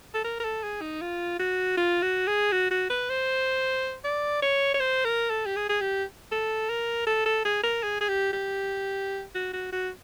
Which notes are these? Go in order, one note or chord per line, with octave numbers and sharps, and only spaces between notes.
A4
A#4
A#4
A4
G#4
D#4
F4
F#4
F4
F#4
G#4
F#4
F#4
B4
C5
D5
C#5
C#5
C5
A#4
A4
G4
G#4
G#4
G4
A4
A#4
A4
A4
G#4
A#4
G#4
G#4
G4
G4
F#4
F#4
F#4